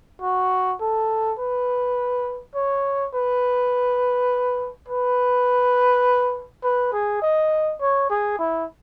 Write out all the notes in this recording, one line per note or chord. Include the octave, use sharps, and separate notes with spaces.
F#4
A4
B4
C#5
B4
B4
B4
G#4
D#5
C#5
G#4
E4